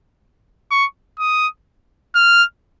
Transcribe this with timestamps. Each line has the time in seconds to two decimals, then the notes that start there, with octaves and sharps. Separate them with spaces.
0.71 C#6
1.19 D#6
2.15 F6